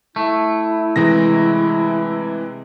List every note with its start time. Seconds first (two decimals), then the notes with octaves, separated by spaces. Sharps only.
0.16 A3 E4
0.96 C3 E3 G#3 A#6